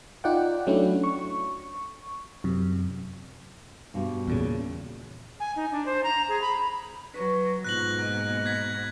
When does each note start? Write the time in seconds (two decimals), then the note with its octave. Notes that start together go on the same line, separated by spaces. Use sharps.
0.24 D#4 F4 D5 F#5 G5
0.67 F#3 A3 C#4 D4 E4
1.04 C#6
2.44 F#2 C3
3.94 G2 B2 G3
4.28 E2 A#2 C#3
5.40 G#5
5.56 D#4
5.71 D4
5.86 C5
6.04 A#5
6.29 G#4
6.42 B5
7.14 F#3 B4 C#6
7.65 G#2 B2 F4 F#6 A#6 F#7
7.99 A#3 D#5
8.46 G#6 B6